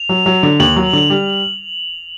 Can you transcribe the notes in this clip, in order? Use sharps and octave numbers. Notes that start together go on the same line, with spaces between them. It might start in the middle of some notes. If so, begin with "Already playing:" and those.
Already playing: F7
F#3
F#3
D3
D#2 F#7
F#3
D3
G3